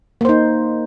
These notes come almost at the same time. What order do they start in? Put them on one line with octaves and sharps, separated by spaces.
A#3 C5 D#4